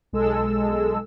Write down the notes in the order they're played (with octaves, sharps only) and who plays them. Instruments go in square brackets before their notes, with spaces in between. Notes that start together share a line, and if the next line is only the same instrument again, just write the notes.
[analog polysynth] B1 G#3 A4 E6